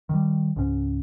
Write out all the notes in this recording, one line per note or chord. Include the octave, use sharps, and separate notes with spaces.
D#3 G3
C#2 G#2 C#4